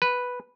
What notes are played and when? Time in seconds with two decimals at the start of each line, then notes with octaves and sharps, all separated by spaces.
0.02 B4